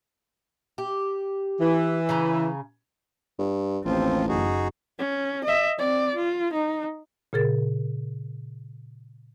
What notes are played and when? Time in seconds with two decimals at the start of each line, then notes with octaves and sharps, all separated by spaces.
0.78 G4
1.60 E3
2.09 C#3 G#5 A#5
3.39 G2
3.85 A1 D#2 F3 C4 F4
4.29 F#1 D#4 F#4 G#4
4.99 C#4
5.45 D#5 E5
5.78 C4 D5
6.15 F4
6.53 D#4
7.33 A#2 C#3 G#4 A#4 A6